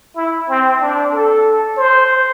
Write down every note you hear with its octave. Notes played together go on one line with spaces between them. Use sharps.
E4
C4
D4
A4
C5